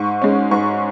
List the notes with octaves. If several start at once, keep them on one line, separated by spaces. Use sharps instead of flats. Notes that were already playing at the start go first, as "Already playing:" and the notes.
Already playing: G#2 C#6
G#3 C#4
G#2 C#6